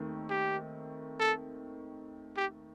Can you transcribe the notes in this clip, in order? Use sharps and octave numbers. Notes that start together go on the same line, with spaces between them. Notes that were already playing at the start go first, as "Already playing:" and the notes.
Already playing: D#2 D#3 A3 C4
G4
A4
G4